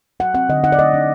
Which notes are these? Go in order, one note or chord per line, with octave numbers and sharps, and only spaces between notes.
F#3 F#5
C4 F#5
D3 D#5
D#4 F#5
D5
A3 D#5
D4